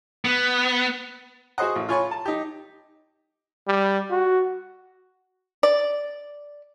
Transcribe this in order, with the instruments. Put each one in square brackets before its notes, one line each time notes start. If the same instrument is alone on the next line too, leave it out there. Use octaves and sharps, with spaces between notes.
[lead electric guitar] B3
[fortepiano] F#4 G#4 C5 D#5 F#5
A1
F4 C#5 G#5 B5 C#6
A5
D#4 G4
[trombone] G3
F#4
[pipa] D5